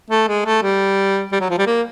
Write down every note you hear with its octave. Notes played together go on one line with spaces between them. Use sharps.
A3
G#3
A3
G3
G3
F#3
F3
G3
A#3